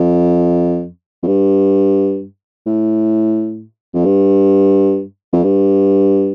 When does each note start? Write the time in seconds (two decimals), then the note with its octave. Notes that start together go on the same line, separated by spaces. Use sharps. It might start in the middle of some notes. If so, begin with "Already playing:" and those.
Already playing: F2
1.23 F2
1.27 G2
2.66 A2
3.94 F2
4.05 G2
5.33 F2
5.44 G2